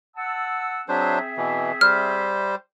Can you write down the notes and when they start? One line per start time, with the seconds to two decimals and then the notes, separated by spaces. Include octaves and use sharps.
0.15 F#5 A5 E6
0.89 F#3 C4 D4 G#4 C5 E5
1.37 B2 E3
1.81 G3 C5 F6